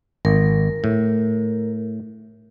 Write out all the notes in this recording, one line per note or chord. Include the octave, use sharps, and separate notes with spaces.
G#1 A#4
A2